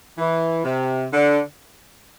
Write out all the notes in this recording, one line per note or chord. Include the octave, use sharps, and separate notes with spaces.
E3
C3
D3